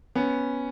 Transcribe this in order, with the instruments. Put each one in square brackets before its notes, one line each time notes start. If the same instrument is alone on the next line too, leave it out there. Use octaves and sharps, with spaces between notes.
[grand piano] B3 C#4